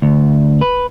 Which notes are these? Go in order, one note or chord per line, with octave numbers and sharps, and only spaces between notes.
D2
B4